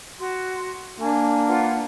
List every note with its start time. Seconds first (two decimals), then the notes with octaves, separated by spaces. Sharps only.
0.19 F#4 C6
1.00 A#3 D4 G#5
1.47 F4 B4 F#5